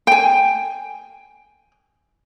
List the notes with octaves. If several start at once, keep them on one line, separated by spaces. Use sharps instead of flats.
G5 G#5